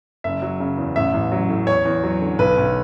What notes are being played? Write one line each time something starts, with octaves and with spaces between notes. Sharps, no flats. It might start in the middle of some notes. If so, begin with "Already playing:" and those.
F#1 E5
F#3
C#3
E2
A1 E5
A1
F#3
A2
E2 C#5
E2
F#3
D3
B1 B4
B1